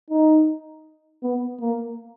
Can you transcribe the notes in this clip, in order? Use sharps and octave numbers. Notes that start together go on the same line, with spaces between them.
D#4
B3
A#3